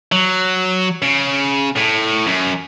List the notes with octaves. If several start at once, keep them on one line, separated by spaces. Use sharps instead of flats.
F#3
C#3
A2
F#2